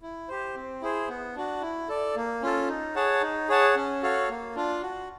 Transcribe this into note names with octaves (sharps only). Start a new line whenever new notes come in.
E4
G4 C5
C4
E4 G#4 C5
B3
D4 F#4
E4
A4 D5
A#3
C#4 F4 A4
D#4
G#4 C#5 F#5 A5
D#4
G#4 C#5 F#5 A5
C#4
F#4 A4 C#5 F5
A#3
D4 F4
F#4